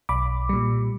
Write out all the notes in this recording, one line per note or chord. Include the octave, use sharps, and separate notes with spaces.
B1 B5 D6
A#2 G3